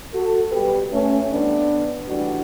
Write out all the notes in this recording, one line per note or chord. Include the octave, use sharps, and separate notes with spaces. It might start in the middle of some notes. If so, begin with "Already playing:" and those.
F#4 A4
B2 G3 G4 B4
A3 C#4
A2 E3 G3 B3 D4
A2 E3 G3 D4 F#4